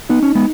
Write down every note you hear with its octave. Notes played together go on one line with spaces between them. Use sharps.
B3 D#4
C#4
G#3 B3